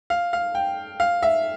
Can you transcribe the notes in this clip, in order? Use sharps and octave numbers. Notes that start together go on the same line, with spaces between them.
F5
F5
G5
F5
E5